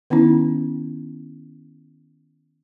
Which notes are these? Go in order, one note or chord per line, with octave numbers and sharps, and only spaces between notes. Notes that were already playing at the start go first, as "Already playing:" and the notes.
D#3 B3 C#4 D#4 E4